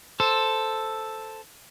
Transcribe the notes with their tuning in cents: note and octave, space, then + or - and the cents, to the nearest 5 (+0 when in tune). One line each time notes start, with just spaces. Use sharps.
A4 +0 C5 +0